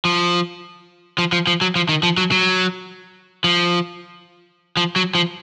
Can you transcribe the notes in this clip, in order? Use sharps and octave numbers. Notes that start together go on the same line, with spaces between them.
F3
F3
F3
F3
F#3
F3
D#3
F3
F#3
F#3
F3
F3
F#3
F3